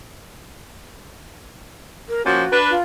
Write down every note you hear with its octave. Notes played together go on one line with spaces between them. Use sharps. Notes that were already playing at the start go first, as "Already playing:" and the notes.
A#4
F3 A#3 C#4 F#4
D4 B4
F4